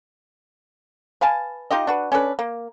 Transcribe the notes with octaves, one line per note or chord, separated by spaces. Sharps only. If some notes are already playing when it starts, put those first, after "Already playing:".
B4 F5 G#5 A5
D#4 F4 G4 D#5
D4 F#4 B4
C#4 D4 A4 B4
A#3